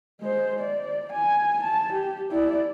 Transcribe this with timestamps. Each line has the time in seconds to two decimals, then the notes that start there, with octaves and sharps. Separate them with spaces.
0.21 G#3 C5
0.60 D5
1.13 G#5
1.63 A5
1.93 G4
2.32 E4 D5